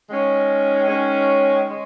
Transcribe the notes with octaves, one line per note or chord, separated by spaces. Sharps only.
D#3 G#3 C#4
D#3 G#3 C#4
G#3 C#4